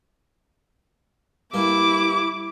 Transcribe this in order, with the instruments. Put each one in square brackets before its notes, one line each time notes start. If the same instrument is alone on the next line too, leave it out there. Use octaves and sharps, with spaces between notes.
[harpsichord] G2 A#3 [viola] E4 D6